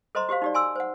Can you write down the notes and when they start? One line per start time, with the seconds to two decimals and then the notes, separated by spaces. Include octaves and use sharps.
0.15 A4 C5 D#5 A#5 C6
0.29 F#4 G4 C5 F5
0.42 D#4 G4 D5
0.55 G#5 C6 E6
0.76 C5 F#5